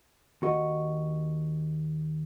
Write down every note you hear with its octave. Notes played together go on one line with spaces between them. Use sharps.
D#2 F#4 D#5